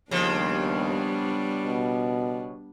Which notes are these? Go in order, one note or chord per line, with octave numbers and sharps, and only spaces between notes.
D#2 C#3 F3 G3 B3 D4
B2